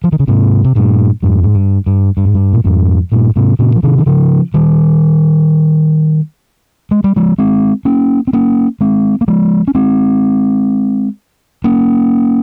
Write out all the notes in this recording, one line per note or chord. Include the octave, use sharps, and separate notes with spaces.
F3
D#3
C#3
G#2 C3
C3
G2 A#2
F2 G#2
G#2
G2
G2
G2
G#2
G2
A#2
F2 G#2
G2 A#2
G#2 C3
A#2 C#3
F3
C3 D#3
D#3
C#3 F3
D#3 G3
G#3
G3
F3 G#3
G#3 C4
A#3 C#4
C4
A#3 C#4
G#3 C4
A#3
F3 G#3
C#4
G#3 C4
A#3 C#4